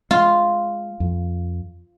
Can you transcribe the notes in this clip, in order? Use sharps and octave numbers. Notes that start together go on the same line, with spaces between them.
G#3 F4
F2